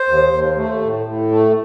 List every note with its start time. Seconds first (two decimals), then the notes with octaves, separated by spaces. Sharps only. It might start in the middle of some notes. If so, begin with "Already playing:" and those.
Already playing: C5
0.09 D#2
0.33 D#2
0.57 A3
0.83 A2
1.06 A2
1.31 A3